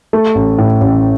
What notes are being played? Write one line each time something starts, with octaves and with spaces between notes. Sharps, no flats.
A3
A1
A2
A1